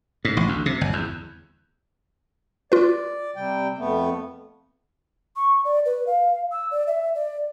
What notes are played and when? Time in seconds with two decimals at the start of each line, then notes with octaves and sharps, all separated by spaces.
0.25 G#2
0.37 A1
0.48 D2
0.66 C3
0.81 G1
0.93 E2
2.72 F4 B4 D5
3.36 C3 G3 G5
3.79 F2 A3 B3
5.36 C#6
5.65 D5
5.86 B4
6.07 F5
6.52 E6
6.71 D5
6.87 E5
7.15 D5